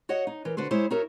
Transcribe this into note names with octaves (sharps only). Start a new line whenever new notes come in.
F#4 C#5 D#5 F#5
D#4
E3 A#4
D3 F#4 B4 C5
G#3 E4 C5 C#5
D#4 F#4 A#4 C#5 E5